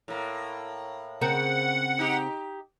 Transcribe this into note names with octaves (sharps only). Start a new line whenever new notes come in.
A2 A#3
C#3 C4 A#4 F#5
D#4 G4